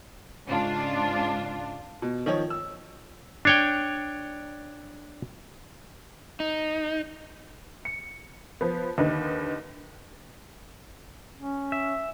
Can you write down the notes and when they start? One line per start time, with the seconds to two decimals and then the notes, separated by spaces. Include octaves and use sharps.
0.47 G#2 C#3 D4 F4
2.02 B2
2.26 D#3 F3 C#5
2.50 E6
3.45 D4 C#5 G5
6.40 D#4
7.85 C#7
8.61 F3 B3
8.98 D#2 D3 D#4 B4
11.37 C#4
11.72 E5